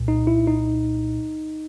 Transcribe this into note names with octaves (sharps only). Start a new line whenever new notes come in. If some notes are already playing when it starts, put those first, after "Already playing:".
Already playing: C2 A#2
D#4
E4
D#4